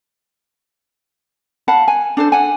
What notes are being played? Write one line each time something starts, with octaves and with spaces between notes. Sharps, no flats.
F5 F#5 A5 B5
G#5
D4 A4 C5
F#5 G#5